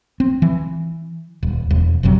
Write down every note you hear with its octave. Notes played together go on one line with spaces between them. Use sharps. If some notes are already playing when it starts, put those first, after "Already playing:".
C4
E3
D#1
E1
F#1 F#2 C3 F#3